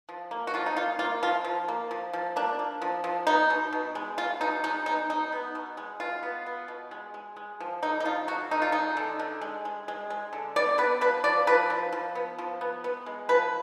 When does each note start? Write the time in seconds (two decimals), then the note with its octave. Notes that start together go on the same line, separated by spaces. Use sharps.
0.09 F3
0.31 A#3
0.47 F#4
0.54 F3 F4
0.66 D#4
0.76 A#3 F4
0.99 A#3 F4
1.23 F3 F4
1.44 F3
1.68 A#3
1.91 F3
2.13 F3
2.36 A#3 D4
2.59 A#3
2.82 F3
3.04 F3
3.27 B3 D#4
3.50 B2
3.73 B2
3.95 G#3
4.18 B2 F4
4.41 B2 D#4
4.64 G#3 D#4
4.86 B3 D#4
5.10 B2 D#4
5.32 B3
5.55 B2
5.77 G#3
6.00 B2 F4
6.23 B3
6.46 B3
6.68 B2
6.91 G#3
7.14 G#3
7.37 G#3
7.60 F3
7.82 D3 D#4
8.00 D#4
8.05 F3 F4
8.28 D3 F#4
8.51 D3 D#4
8.62 F4
8.72 G#3 D#4
8.97 D3
9.19 D3
9.41 G#3
9.65 G#3
9.88 G#3
10.10 G#3
10.33 D3
10.56 B3 D5
10.78 B3 B4
11.01 F3 B4
11.24 F3 D5
11.47 F3 B4
11.70 F3
11.92 F3
12.15 B3
12.38 F3
12.61 B3
12.84 B3
13.06 G#3
13.29 F3 B4